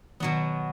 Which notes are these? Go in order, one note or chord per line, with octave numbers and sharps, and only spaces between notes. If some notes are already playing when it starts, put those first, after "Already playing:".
B2 D#3 F#3 B3